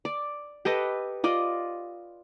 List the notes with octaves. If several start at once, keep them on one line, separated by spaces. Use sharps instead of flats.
D5
G4 A4 B4 D#5
F4 D5 D#5